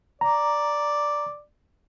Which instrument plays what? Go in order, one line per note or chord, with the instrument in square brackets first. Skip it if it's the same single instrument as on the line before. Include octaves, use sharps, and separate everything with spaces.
[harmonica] D5 [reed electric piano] A#5